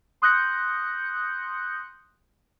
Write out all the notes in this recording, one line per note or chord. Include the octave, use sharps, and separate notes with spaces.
C6 D#6 F#6 G6 A#6 C#7